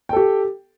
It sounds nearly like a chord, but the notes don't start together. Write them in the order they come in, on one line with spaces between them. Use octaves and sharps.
G5 A4 G4